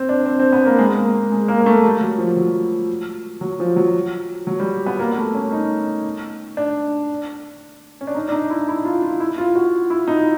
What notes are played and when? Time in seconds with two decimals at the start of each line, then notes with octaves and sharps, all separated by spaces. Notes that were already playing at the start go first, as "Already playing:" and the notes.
Already playing: C4
0.09 D4
0.26 C4
0.39 C4
0.52 B3
0.66 A#3
0.79 G#3
0.96 A#3
1.32 G#3
1.48 A#3
1.60 A#3
1.66 A3
1.84 G3
2.01 F#3
2.18 F3
2.37 F#3
3.41 F#3
3.60 F3
3.76 F#3
4.47 F#3
4.60 G3
4.87 B3
4.99 A#3
5.16 A3
5.35 C#4
5.52 D#4
6.57 D4
8.01 C#4
8.07 D4
8.15 D#4
8.29 D4
8.32 D#4
8.50 E4
8.68 E4
8.85 F4
9.02 F4
9.20 E4
9.38 F4
9.56 F#4
9.90 E4
10.08 D#4